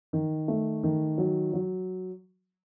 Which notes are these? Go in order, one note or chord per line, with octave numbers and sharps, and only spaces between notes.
D#3
A3
D#3
F#3
F#3